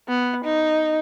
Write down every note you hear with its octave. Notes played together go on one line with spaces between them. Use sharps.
B3
D#4